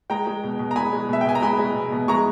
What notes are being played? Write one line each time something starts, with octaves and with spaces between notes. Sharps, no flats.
G#3 G5 A#5
G#3
B2
B2
A#5
G#3 G#5 B5
G#3
B2 E5
G5
B2 G#5
A#5
G#3 G#5 B5
G#3
B2
B2
G#3 A#5 C#6